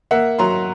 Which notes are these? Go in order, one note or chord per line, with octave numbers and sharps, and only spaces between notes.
A#3 E5 F#5
F#3 A#5 C6